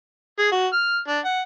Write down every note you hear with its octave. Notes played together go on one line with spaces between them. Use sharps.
G#4
F#4
F6
D4
F#5